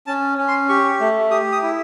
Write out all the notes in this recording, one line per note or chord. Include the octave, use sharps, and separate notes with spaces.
C#4 A5
C#4
C6
G4 C#6
A3
G4 D#6
D#6
E4